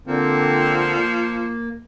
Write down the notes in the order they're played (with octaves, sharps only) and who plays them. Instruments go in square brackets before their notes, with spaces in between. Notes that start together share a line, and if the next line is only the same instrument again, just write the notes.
[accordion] D3 A#3 C4 [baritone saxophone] F3
[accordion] A#3